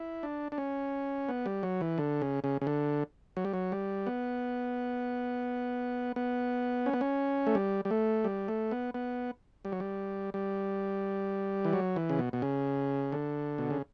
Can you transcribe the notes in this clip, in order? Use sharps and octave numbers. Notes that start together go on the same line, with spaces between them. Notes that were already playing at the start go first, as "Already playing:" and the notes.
Already playing: E4
D4
D4
C#4
B3
G3
F#3
E3
D3
C#3
C#3
C#3
D3
F#3
G3
F#3
G3
B3
B3
C#4
B3
C#4
A3
G3
G3
A3
G3
A3
B3
B3
G3
F#3
G3
G3
E3
F#3
E3
C#3
B2
B2
C#3
D3
B2
C#3